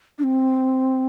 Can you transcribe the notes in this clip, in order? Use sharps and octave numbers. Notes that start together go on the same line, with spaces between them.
D4
C4